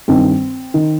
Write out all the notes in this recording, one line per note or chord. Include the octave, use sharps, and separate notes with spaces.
G2 D#3 C4
D#3